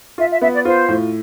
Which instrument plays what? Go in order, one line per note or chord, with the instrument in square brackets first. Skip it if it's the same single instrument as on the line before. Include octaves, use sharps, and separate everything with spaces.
[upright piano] F4 [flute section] E5
[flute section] E5
[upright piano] B3 [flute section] E5
[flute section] D5
[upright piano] F4 [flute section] C5
[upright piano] A2